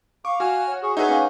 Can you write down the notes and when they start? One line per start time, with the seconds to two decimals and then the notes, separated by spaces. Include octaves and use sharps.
0.25 F5 C#6 D6
0.40 F#4 G#5 F6
0.67 C#5
0.82 G#4 C#6
0.97 D#4 G#4 B4 C#5 E5 F#5
1.08 A#3 C#4